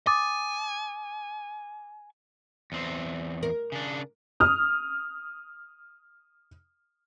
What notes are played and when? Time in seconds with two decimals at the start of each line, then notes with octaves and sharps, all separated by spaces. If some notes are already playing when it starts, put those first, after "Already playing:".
0.07 G#5 D6 D#6 A6
2.72 E2 C4
3.43 A#4
3.72 C#3 D4
4.40 D#6 F6